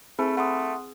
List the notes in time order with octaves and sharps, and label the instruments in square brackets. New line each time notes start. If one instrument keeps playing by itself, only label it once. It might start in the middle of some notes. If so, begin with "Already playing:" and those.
[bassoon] A3 [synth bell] C4 G#4 [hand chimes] B5
[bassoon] A3 [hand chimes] F#5 C6 D#6